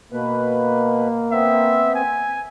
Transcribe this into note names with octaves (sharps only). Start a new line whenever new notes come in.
B2 A#3 B4
B3 C4 E5
G#5